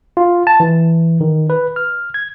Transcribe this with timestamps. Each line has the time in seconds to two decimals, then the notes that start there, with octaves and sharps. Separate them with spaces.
0.17 F4
0.47 A5
0.60 E3
1.21 D#3
1.50 B4
1.76 F6
2.14 G#6